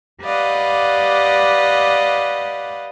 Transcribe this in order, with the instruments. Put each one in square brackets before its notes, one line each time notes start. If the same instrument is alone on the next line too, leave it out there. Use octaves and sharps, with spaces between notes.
[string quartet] G4 B4 D5 D#5 F5 F#5